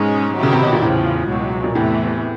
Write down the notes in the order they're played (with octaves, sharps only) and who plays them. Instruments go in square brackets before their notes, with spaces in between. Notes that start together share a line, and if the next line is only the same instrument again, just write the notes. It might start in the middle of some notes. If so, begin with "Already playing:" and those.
Already playing: [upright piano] G#2 [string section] B2 G#3 C#4
[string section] D#3 F#3 B3 E4 G4
[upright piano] C#3
C3
B2
A#2
[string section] E2 C#3 F3 [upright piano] A2
[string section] C#2 B2 F#3
[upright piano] A#2
[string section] E2 C3 E3 A3 [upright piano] A2